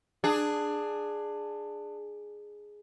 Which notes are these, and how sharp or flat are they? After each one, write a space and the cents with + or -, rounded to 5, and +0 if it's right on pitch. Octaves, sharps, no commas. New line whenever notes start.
D4 +15 G#4 +0